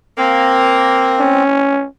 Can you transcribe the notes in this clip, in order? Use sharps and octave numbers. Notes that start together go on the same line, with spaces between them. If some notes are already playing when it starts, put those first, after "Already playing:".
A#3 C4
C#4